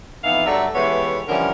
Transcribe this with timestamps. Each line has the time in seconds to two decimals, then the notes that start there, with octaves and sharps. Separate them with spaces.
0.24 F2 E3 B3 D#4 E5 F5
0.46 G2 F#3 A3 A4 D5 E5
0.75 E3 G#3 A3 B3 G4 C#5
1.28 D3 E3 F3 G3 C#4 A#4